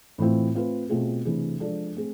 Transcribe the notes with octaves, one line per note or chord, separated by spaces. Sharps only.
A2 E3 A3 C4 F4
A3 C4 F4 B4
B2 A3 C4 F4 G#4
C3 E3 A3 D4 G#4
F3 G#3 D4 A4 D5
A3 C4 G#4